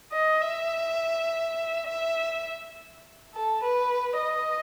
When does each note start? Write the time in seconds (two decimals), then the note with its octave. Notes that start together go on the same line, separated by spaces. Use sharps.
0.12 D#5
0.41 E5
1.87 E5
3.34 A4
3.63 B4
4.22 D#5